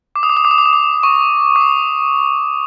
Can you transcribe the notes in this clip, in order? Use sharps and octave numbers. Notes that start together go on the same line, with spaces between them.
D6
D#6
D6
D#6
D6
D#6
D6
D#6
D6
C#6
D6
D#6